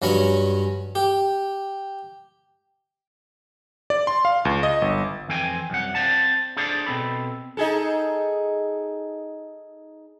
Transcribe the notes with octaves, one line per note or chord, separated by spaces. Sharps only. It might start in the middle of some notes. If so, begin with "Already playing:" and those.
G2 F#3 C#4 B5 C#6
G4
D5
C6
F5
C#2
D#5
G1
F2 E3 C4 G5 G#5
C2 F#2 F#5
C4 C5 D5 A5
D4 G#4 A4 C5 D5
B2 C4 A4 B5
D#4 G#4 A4